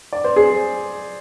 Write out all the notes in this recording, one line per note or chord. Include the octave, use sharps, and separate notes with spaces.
D5
C5
G#4